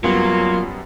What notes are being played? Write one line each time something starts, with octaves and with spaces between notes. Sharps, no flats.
F#2 F#3 G3 A#3 B3 F4